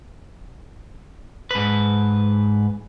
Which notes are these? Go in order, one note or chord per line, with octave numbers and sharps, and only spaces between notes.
G#2 B4